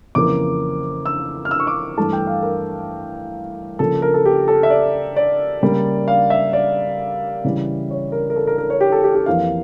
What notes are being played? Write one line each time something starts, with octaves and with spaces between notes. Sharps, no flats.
F2 C#3 E3 A#3 D6
E6
F6
E6
C#6
D6
G2 E3 A3 A5
G5
F5
A#4
C#3 F3 A#3 A4
A#4
A4
G4
A4
E5
D5
D5
C#3 G3 A#3
F5
E5
D5
C#3 E3 G3
C#5
A#4
A#4
A4
A#4
A#4
C#5
G4
A4
G4
G4
F2 E3 A#3 F5